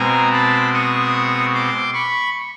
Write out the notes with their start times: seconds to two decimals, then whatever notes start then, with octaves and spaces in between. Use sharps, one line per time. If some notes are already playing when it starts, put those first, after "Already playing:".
Already playing: B2 G#3 C4 G#5 A#5
0.32 A5 B5
0.73 C#6 D#6
1.54 C6 D6
1.93 B5 C#6